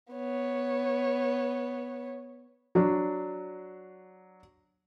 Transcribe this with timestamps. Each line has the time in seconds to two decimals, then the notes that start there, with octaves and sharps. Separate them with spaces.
0.12 B3 C#5
2.75 F#3 D4